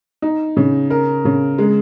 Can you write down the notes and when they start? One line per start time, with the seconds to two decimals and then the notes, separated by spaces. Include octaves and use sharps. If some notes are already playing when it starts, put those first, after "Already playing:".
0.22 D#4
0.57 C#3
0.90 A#4
1.25 C#3
1.58 G#3